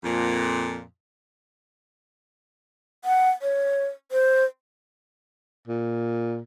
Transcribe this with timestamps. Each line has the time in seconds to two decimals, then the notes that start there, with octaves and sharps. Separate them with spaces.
0.04 F2 A#2
3.05 F#5
3.42 C#5
4.12 C5
5.67 A#2